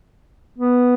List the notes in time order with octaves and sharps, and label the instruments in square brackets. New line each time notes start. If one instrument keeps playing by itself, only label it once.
[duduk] B3